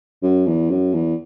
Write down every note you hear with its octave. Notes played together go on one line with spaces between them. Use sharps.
F#2
E2
F#2
E2